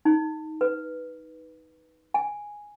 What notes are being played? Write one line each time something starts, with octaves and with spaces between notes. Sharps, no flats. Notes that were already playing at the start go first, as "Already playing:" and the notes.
D#4
B4
G#5